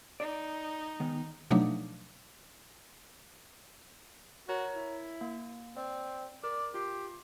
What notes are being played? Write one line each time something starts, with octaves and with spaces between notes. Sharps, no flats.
D#4 D5
D#3 G#3 B3
B2 F3 F#3 A3 D4 D#4
F#4 A#4 C#5 A#5
E4
A#3
C4 D5
A#4 D5
F4 G4 C7